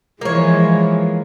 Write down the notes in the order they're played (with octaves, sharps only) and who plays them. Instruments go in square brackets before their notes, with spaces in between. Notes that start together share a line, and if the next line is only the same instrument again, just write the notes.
[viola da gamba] E3 F3 G#3 [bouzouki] A#3 C#5